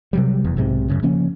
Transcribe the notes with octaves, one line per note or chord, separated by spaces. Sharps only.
C3 F#3 G3
F1 E2
B1 G#2 C3
F#2 A2 C#3
C#3 F3 A#3 C#4